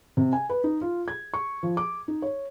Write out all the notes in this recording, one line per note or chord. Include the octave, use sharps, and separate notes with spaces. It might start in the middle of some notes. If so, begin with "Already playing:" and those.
C3
G#5
B4
D#4
F4
G#6
C#6
F3
D6
D#4
C#5